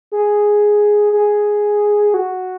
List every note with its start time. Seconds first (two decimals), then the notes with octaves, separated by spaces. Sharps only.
0.12 G#4
1.13 G#4
2.14 F#4